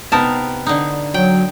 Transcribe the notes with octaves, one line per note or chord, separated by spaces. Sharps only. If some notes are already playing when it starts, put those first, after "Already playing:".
C3 B3 D#4 A#4 A5
D3 D#4
F#3 G5